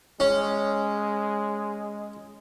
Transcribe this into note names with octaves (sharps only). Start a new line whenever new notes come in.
G#3 C#4